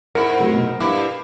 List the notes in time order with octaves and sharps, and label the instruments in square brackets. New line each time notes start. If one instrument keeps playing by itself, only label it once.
[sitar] G#2 E4 [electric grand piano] A#4 [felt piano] C#7
[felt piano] C3 F#3 A3
B2
[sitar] G2 E4 [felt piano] D6